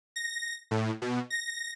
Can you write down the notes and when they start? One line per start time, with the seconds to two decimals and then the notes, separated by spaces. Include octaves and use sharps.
0.16 A#6
0.71 A2
1.02 B2
1.30 A#6